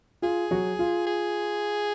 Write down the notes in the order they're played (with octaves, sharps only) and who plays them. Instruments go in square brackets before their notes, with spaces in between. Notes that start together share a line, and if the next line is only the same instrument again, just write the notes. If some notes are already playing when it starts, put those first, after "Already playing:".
[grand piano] F4 [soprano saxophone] G#4
[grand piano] F#3 F#4
F4
[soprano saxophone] G#4